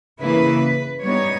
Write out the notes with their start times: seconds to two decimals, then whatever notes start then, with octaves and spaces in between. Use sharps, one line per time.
0.20 C#3 E3 A#3 E4 B4
1.02 G3 B3 D#4 C#5